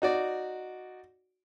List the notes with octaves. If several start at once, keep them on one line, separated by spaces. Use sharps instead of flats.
D#4 F#4 D5